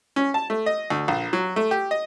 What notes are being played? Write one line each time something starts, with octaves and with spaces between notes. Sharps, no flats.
C#4
A5
A3
D#5
D2
A#1
F#3
A3
G4
D#5